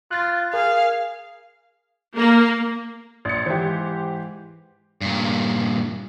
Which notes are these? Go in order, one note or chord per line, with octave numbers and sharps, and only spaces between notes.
F4 F#6 A6
G#4 A#4 F5
A#3
A#1 C6 C#7
G#2 E3 G4 C5
G2 A#2